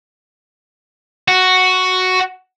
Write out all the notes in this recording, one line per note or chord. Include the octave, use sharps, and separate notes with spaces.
F#4